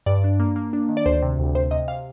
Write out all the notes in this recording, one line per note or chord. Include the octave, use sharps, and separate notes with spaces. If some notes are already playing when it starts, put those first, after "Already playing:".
G2 D5
D4
A#3
A#3
D4
D#3
D5
D2 C5
C3
D2
C3 C5
C3 D#5
C3 F5